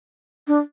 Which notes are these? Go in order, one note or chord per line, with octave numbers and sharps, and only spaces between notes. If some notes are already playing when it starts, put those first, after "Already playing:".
D4